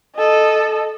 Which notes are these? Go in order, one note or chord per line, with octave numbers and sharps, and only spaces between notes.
A4 D#5